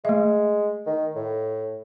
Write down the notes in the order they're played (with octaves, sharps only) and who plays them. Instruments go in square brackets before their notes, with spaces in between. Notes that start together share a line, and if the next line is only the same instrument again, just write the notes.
[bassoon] G#3 [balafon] A3 E5
[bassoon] D#3
A2